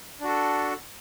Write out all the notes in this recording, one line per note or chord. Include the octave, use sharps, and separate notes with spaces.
D4 F#4 A4